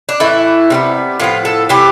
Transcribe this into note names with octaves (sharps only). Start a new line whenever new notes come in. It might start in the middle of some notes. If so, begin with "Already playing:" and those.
D4
A2 E3 A3 E4
C3 G3 B3
A2 F3 B3 F4
A4
C3 E3 B3 G4